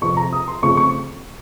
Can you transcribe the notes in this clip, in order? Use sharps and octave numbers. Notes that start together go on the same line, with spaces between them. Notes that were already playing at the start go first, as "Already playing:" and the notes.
F2 C3 F3 C4 C#6
A#5
D#6
C6
F2 C#3 A3 C4 C#6
C#6